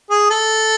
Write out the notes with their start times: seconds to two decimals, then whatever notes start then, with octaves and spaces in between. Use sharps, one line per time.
0.10 G#4
0.30 A4